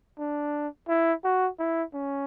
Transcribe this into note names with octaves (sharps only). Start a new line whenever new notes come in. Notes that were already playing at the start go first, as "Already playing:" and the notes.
D4
E4
F#4
E4
C#4